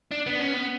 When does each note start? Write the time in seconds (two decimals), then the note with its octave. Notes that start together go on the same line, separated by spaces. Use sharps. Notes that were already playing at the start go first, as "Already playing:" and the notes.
0.11 D4
0.27 B3
0.39 C#4
0.54 B3